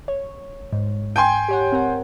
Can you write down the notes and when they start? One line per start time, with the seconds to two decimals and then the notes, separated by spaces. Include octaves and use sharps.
0.08 C#5
0.73 G#2
1.16 G5 G#5 C6
1.48 G4 C#5 F#5
1.72 C4 A#4 F#5